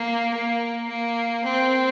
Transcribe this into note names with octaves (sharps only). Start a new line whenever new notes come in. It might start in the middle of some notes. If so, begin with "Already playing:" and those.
Already playing: A#3
A#3
A#3
C4